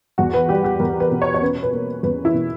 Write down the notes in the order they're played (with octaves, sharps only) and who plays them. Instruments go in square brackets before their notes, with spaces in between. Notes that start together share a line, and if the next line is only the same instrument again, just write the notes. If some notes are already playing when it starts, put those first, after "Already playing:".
[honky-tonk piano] E2 F#4
B4
G3 G4
G4
E2 A#4
B4
B2
C#5
C#5
C#4 B4
B4
A#3
E2 B4
E4
B2